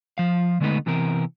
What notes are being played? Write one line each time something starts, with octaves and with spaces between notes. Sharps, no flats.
F3 F5
D3 G#3 A3 B3 D#4 B4
C3 E3 B3 C4 A#4